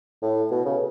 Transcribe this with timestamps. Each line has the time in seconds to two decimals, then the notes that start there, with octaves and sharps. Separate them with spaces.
0.22 A2
0.51 B2
0.65 C#3